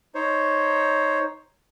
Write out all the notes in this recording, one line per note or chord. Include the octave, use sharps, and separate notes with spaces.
D#4 C5 C#5